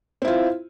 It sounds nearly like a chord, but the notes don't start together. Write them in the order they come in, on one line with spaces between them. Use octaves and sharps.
C4 E4 F4